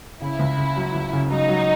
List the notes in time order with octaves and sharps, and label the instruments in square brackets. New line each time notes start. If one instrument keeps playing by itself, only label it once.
[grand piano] C#3 [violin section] E4
[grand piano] C#2
C#3
F#3
C#2
C#3
[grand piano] F#3 [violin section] D#4
[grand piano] F#3